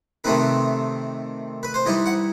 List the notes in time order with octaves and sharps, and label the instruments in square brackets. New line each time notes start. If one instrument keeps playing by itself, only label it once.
[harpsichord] C3 D#3 A3 C4 D#4 B4
B4
C5
E3 G3 D#4 D#5
F#5